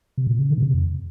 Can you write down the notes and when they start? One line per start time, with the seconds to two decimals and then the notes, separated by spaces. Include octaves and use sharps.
0.18 C3
0.27 A#2
0.39 C#3
0.50 D#3
0.58 A#2
0.62 C3
0.74 F2